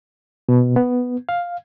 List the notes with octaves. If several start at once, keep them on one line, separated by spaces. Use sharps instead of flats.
B2
B3
F5